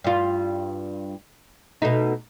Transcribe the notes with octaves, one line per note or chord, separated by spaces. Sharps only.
G2 F4
B2 A3 D#4